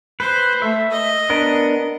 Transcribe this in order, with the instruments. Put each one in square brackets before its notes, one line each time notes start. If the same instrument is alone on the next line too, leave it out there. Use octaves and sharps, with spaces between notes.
[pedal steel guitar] B4 [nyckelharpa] C5
[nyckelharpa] A3 [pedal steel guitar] E5
[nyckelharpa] D#5
[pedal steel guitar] B3 D4 A#4